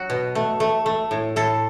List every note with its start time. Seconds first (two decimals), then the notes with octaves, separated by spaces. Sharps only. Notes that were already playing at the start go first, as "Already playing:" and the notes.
Already playing: F#3 F#4
0.10 B2
0.35 A3
0.60 A3
0.86 A3
1.11 A2
1.36 A2 A4